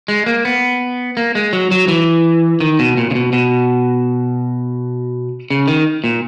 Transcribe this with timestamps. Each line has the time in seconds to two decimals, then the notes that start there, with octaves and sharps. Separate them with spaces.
0.08 G#3
0.26 A#3
0.45 B3
1.17 A#3
1.35 G#3
1.53 F#3
1.71 F#3
1.88 E3
2.60 D#3
2.79 B2
2.97 A#2
3.11 C#3
3.15 B2
3.33 B2
5.50 C#3
5.68 D#3
6.04 A#2